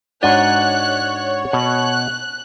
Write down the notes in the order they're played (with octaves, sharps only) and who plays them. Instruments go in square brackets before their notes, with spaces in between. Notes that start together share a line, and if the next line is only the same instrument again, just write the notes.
[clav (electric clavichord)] G#2 D4 F#4 [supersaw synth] C#5 [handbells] D5 F#5 [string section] F#6
[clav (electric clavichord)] B2 [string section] F#6